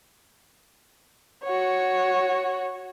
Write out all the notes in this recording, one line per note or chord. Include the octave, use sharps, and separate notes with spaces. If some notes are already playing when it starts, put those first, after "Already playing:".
F#4 C#5